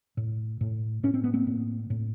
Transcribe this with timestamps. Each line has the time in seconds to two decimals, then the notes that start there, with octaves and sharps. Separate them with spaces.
0.17 A2
0.61 A2
1.03 A2 C#4
1.14 C4
1.24 B3
1.34 A#3 C4
1.47 A2
1.90 A2